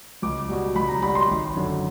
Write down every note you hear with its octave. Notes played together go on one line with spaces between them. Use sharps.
C#2 D6
B2 G3
C#2 B5
A#5
B2 G3 B5
C6
G#1
F#2 D3